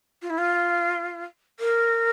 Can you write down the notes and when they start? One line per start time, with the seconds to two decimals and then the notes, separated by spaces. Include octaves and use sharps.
0.22 F4
0.30 E4
0.38 F4
1.60 A#4